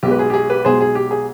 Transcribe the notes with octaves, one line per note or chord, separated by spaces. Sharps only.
B1 B2 G#3 G4
B4
G#4
G4
G#4
G4 B4
B1 B2 G#3 G#4 C5
G#4
G4
G#4